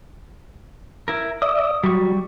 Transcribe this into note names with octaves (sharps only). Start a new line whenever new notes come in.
E4 A#4
D5 E5 D#6
F#3 G3 C#6